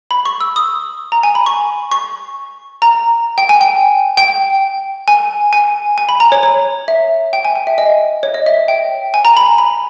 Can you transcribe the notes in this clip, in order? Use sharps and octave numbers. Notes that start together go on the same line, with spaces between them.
B5
C#6
E6
D#6
A#5
G#5
B5
C#6
C#6
A#5
G5
G#5
G5
G5
G#5
G#5
G#5
B5
A#5
C#5
C#5
E5
G5
G#5
G#5
E5
D#5
C#5
D#5
E5
G5
G#5
A#5
B5
B5